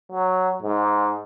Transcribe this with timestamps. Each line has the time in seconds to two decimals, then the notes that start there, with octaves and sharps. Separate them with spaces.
0.12 F#3
0.63 G#2